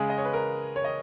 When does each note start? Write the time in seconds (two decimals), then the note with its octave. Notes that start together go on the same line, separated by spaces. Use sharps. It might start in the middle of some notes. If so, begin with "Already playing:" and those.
Already playing: C#3 G#3 G#4
0.10 D#5
0.18 C#5
0.25 B4
0.33 A#4
0.76 C#5
0.84 D#5